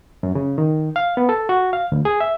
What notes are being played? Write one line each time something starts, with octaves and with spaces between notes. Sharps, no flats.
F#2
C#3
D#3
F5
B3
A4
F#4
F5
D2
G#4
E5